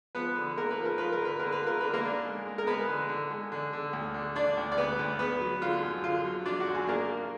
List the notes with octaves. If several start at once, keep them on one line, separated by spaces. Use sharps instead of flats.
F3 B3 B4
D3
A#3 A#4
B4
F3
A#4
F4 B4
A#4
D3
B4
D3 A#4
B4
F4 A#4
D3 B4
A#3 A#4
D4
G#3
G#3
A#4
G#3 B3 B4
D3
D3
G#3
D3
D3
D2
D3
D3 D4 D5
D2
D5
D2 B3 B4
D2
B3 B4
F#3
D3 F4
F#2
D3 F4
F#3
F#3 D4 D5
F#4
F#2
G#4
A#3 D4 A#4
A#3